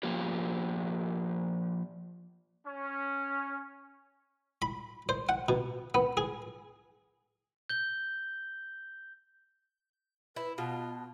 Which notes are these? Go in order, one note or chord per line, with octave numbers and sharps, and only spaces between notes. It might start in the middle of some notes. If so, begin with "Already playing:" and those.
F3 A#3 F4 G4
C#4
B5
C5
F#5
B2
B3
G#4
G6 G7
E4 B4
B2 F4 A5